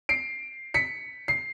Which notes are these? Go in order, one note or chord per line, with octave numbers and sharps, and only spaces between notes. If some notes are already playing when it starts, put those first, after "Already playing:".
C7 D7
B6 C#7
C7